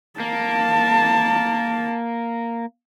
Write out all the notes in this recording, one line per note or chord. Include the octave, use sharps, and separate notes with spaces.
A#3 A5